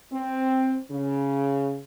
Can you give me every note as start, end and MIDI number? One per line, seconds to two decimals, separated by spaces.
0.13 0.78 60
0.92 1.79 49